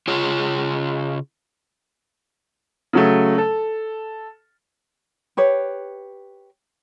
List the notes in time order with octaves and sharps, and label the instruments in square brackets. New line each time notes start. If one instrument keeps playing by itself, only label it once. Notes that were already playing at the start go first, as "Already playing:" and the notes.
[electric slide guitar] C#3 F4 G#4 C#5
[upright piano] C#3 F#3 A3
A4
[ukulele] G4 B4 C#5